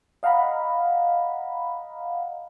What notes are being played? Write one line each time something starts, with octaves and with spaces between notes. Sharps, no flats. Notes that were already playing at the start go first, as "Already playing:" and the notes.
D#5 F5 F#5 A#5 B5